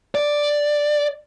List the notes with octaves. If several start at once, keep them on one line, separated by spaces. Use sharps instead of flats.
D5